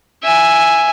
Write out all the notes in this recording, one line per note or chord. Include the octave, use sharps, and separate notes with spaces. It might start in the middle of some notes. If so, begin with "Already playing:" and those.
E5 G#5